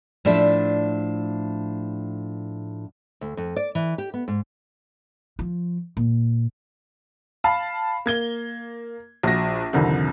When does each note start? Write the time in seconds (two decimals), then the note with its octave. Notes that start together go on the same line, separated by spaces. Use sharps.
0.25 A2 F3 D4 D5 E5
3.21 D2
3.37 F2
3.56 D5
3.75 E3
3.98 G4
4.14 B3
4.28 G#2
5.39 F3
5.97 A#2
7.44 F5 A5 B5
8.06 A#3 G#6 G7
9.23 A#1 F#4 A#6
9.73 C2 F2 D3 D#3